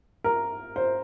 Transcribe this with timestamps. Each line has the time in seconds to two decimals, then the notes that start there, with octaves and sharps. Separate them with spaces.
0.24 A#4
0.76 C5